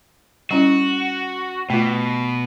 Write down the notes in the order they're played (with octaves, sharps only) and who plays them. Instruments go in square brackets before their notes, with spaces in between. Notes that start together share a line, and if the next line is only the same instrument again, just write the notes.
[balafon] G3 C#4 E4 [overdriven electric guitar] F#4
[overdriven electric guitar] B2 [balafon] A3 F4